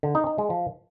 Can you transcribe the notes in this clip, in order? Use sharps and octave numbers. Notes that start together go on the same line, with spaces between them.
D3
D#4
D#4
G#3
F3